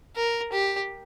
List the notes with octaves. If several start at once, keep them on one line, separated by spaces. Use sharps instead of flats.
A#4
G4